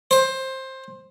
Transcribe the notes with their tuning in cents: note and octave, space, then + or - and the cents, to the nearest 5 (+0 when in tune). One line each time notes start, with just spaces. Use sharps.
C5 +15